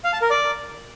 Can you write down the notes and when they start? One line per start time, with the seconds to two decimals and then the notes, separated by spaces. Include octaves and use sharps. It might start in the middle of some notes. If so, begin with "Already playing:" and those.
0.04 F5
0.13 A5
0.22 A#4
0.30 D5